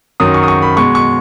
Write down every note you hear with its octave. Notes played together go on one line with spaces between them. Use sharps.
F#2 D#3 F#3 D#6
C#6
D#6
C#6
B5
B2 G#3 C#6
C#6